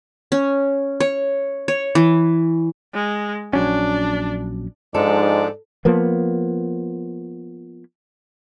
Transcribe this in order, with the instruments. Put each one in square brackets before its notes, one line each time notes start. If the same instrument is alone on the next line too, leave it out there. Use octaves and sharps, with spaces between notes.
[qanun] C#4
C#5
C#5
E3
[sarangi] G#3
[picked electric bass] A#1 F#3 C#4 [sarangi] D4
[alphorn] G#2 [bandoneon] F3 G#3 D4 [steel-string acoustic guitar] D#4 A4 [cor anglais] D5
[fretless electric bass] F3 A#3 B3